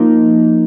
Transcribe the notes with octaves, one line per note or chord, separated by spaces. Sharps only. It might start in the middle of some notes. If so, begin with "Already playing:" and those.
Already playing: F3 A#3 D#4